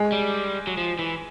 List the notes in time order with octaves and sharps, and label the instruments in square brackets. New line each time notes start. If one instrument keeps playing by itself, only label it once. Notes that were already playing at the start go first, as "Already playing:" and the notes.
Already playing: [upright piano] G#3
[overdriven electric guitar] G3
F#3
F3
E3